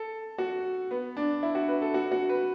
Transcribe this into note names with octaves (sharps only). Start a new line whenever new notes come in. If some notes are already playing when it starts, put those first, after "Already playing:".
Already playing: A4
F#4
B3
D4
E4
F#4
B4
A4
F#4
F#4
B4